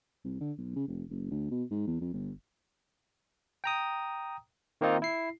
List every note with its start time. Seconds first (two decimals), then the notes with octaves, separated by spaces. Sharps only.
0.25 C2
0.41 D3
0.58 B1
0.76 C#3
0.88 F1
1.10 F#1
1.31 D2
1.51 B2
1.71 G#2
1.87 E2
2.01 F2
2.13 G1
3.64 G5 A#5 D#6
4.81 D#3 A#3 C4 D#4 F4
5.02 E4 C7